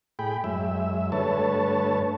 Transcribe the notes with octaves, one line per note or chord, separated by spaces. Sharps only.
A2 G#4 G5 B5
F#2 G#3 E5
G2 D3 A3 B4 C#5 A5